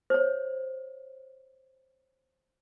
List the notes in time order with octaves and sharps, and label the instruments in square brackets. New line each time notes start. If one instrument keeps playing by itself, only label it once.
[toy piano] C5 C#5